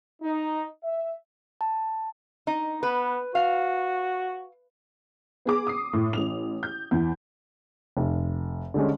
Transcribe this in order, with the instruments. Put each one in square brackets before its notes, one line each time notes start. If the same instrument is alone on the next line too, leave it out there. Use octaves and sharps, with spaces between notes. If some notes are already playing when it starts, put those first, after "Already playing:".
[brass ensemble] D#4
E5
[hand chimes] A5
[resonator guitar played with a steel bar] D#4
[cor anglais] B3 [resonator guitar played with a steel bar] B4
[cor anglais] F#4 [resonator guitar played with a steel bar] F5
[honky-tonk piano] B3 G#4 D6
D#6 C7
A2
A1 F7
G6
E2
[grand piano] F1
D3 G3 G#3 C#4